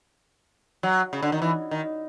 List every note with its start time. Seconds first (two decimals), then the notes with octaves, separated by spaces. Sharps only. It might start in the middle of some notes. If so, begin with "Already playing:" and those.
0.83 F#3
1.13 C#3
1.23 D3
1.32 D#3
1.42 E3
1.71 D#3